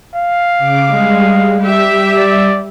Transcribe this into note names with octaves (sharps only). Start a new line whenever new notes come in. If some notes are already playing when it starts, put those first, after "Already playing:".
F5
C#3 D6
G3 G#3
G4 E5
D5